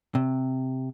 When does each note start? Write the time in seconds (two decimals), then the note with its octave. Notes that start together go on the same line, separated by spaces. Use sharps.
0.15 C3